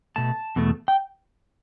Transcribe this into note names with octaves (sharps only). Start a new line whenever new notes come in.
B2 A3 A5
E2 B2 A3
G5